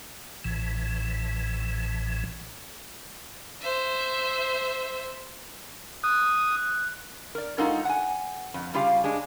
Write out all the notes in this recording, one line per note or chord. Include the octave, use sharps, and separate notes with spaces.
A1 A2 E3
C5 E5
D#6 F#6
A#4 D5
G#3 D#4 F4 F#4 A4 A#4
F#5 G#5
F2
C#3 G3 F4 G4 F5
G#3 D4